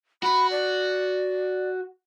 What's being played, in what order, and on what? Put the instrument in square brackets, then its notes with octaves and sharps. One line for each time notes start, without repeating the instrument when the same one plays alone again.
[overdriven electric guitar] F#4 [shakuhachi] B5
[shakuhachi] D5